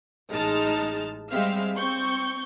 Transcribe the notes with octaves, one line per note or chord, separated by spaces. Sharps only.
A1 G#3 D#4 A5 F6 A6
G3 G#3 C4 E5 F5 F6
C4 C#6 G6